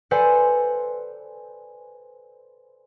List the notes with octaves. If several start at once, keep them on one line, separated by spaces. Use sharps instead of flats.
A4 B4 C5 D5 F#5 G#5